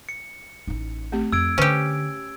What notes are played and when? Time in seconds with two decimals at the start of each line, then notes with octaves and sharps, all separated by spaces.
0.09 C#7
0.67 A1 D#4
1.12 A3 C4 G4
1.32 F2 E6 G#6 D7
1.58 D3 C#4 G4 B4 C5